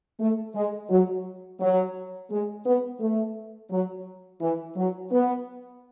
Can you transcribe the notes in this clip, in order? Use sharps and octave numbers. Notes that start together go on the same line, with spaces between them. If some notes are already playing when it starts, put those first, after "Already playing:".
A3
G#3
F#3
F#3
G#3
B3
A3
F#3
E3
F#3
B3